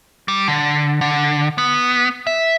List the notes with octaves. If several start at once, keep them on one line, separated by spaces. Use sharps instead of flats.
G3
D3
D3
B3
E5